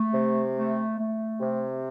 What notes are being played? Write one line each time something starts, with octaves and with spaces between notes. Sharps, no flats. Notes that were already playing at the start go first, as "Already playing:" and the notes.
Already playing: A3
C3
A3
A3
C3